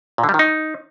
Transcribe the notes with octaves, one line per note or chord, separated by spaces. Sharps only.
A#2
D3
G3
D#3
D#4